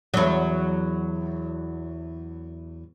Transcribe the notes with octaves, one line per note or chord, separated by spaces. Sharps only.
E2 F#3